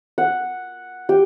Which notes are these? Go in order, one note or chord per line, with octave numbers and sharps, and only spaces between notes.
F#5
G4